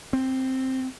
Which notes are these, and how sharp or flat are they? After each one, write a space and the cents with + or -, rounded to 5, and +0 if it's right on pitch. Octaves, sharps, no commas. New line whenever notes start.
C4 +5